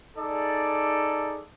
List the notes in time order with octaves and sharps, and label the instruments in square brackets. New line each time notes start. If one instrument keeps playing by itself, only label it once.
[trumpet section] D#4 G#4 A4 D5